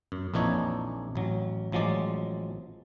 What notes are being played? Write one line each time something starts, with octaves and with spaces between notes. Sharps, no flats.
F#2
A#1 F2 E3 D4 D#4 C#5
A1 F#3
A1 F3 F#3 G#3 D5